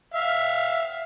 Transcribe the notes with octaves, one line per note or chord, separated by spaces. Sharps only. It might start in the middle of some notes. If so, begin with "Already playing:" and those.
E5 F5